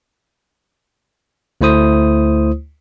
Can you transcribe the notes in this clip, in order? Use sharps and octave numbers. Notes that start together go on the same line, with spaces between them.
D2 A3 E4 C5 D#6